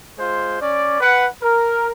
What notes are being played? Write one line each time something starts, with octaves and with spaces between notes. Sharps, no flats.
G#3 F4 C5
C#4 D5
B4 F#5
A#4